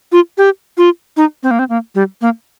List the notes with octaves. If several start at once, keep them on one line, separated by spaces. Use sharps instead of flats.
F4
G4
F4
D#4
C4
A#3
C4
A#3
G3
A#3